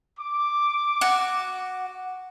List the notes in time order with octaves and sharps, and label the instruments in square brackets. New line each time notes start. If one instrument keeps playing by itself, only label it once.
[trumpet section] D6
[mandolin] F#4